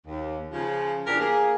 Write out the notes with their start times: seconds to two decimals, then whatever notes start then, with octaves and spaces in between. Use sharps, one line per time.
0.07 D#2
0.52 C#3 F3
1.06 E2 F3 D4 G4 G#4 A#4
1.20 A#3 G#4